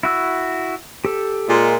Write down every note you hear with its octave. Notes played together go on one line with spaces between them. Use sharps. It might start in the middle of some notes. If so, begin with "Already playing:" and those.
E4 F#4 E6
G4 A4
A#2 G#3